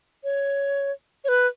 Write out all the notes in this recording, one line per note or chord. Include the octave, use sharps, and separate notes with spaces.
C#5
C#5
B4